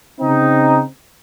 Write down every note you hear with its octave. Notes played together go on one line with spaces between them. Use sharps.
C#3 C4 D#4